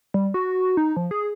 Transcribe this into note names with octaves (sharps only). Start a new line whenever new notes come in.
G3
F#4
D#4
F3
G#4